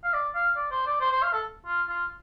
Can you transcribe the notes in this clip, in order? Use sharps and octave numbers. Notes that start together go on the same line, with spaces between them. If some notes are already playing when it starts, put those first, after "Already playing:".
F5
D5
F5
D5
C5
D5
C5
C5
F5
A4
F4
F4